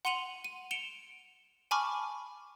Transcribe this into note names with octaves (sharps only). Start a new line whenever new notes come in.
F#5 C6 C#7 D#7 F7 F#7
D#7
C#7 D7 E7 F7 G7
G#5 A5 B5 C#6 D6 F6